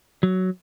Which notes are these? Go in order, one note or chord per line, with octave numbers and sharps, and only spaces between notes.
F#3